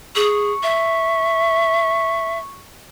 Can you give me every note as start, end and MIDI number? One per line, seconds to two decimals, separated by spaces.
0.16 0.52 68
0.16 2.65 85
0.63 2.38 76